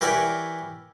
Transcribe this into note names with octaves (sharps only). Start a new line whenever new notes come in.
E3 G4 A#4 B4 C#5 D5